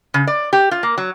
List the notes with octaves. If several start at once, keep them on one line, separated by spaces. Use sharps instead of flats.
C#3
D5
G4
F4
A#3
F#3